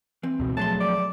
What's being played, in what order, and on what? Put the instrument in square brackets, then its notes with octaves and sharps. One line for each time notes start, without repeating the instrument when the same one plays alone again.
[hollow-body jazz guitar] E3 C4
[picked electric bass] C#2 B2
[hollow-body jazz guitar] F3 G#4 C6 [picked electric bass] F#3 A3 [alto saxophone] A5
[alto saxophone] D5